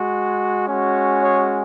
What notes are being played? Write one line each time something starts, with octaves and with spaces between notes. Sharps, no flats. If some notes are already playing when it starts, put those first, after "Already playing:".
Already playing: G#3 F#4
G#3 C#4 F#4
G#4 C#5